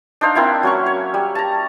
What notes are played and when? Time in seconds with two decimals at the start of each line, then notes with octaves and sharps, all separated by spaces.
0.21 D4 D#4 C5 F5
0.35 A#3 C4 E4 F#5
0.63 F#3 C#4 C#6
0.86 C#5
1.14 G3
1.35 A5 A#5